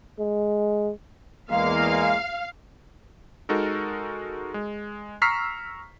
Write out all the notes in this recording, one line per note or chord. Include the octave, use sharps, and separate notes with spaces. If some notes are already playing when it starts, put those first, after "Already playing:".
G#3
E2 G#3 A#3 F5
G#3 D#4 F#4 A4 A#4
G#3
A#5 C#6 E6 F6 B6 C7